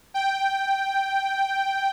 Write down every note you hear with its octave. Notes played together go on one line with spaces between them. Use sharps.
G5